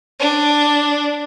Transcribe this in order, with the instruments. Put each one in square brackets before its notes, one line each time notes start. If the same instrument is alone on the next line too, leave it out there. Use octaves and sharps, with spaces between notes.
[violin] D4